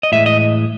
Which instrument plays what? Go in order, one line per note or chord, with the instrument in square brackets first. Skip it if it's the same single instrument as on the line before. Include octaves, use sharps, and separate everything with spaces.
[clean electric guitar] D#5
[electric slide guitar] A2 E3 G#3 [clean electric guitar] E5
[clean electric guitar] D#5